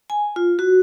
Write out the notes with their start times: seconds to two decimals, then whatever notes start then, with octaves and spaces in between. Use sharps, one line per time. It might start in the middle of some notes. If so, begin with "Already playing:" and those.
0.10 G#5
0.36 F4
0.59 F#4